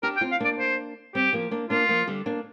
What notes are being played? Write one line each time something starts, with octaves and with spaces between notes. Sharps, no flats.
D4 G4 A#4
G5
C4 F4
F5
A#3 D4 D5
C5
G3 C4 G4
F3 A#3
A#3 D4
A#3 D4 F4
F3 A#3
D3 G3
A#3 D4